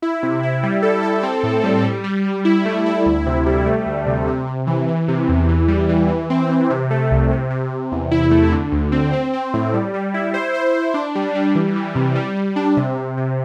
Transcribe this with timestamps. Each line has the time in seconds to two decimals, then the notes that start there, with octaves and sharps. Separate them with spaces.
0.02 E4
0.23 C3
0.43 E4
0.63 G3
0.82 A4
1.03 A4
1.23 C4
1.43 A2
1.63 G3
1.85 G3
2.04 G3
2.25 G3
2.45 E4
2.65 A3
2.86 E4
3.06 D2
3.26 C3
3.46 G3
3.66 A3
3.86 D2
4.07 C3
4.27 C3
4.47 C3
4.67 E3
4.88 E3
5.08 C3
5.28 E2
5.49 E3
5.68 G3
5.89 E3
6.09 E3
6.30 C4
6.49 E3
6.70 C3
6.90 A3
7.11 C2
7.31 C3
7.50 C3
7.70 C3
7.92 E2
8.11 E4
8.31 A3
8.52 D3
8.72 D2
8.92 C4
9.13 C4
9.33 C4
9.54 A2
9.74 G3
9.94 G3
10.14 E4
10.34 C5
10.54 C5
10.74 C5
10.94 D4
11.15 G3
11.35 G3
11.55 E3
11.76 E3
11.95 C3
12.16 G3
12.37 G3
12.56 D4
12.77 C3
12.97 C3
13.17 C3